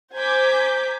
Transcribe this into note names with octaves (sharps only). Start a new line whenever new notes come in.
C5 G#5 A#5 D6 G6 B6